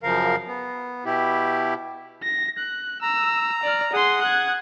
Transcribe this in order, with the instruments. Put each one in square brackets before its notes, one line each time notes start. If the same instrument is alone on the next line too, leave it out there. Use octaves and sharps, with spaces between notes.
[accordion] F#2 C#3 F3 A#4 F5
B3
B2 E4 G4
[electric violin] A#6
F#6
[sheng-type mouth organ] A#5 [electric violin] E6
[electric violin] D5 F6
[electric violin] G#4 C6 [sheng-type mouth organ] F#5 D#6
[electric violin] F#6 G#6